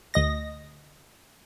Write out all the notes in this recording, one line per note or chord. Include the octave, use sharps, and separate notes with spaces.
D2 D#5 A#6